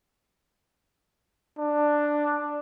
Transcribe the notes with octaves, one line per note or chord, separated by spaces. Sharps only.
D4